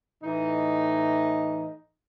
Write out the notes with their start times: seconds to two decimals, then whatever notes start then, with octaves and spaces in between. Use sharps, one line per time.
0.23 A2 E3 D#4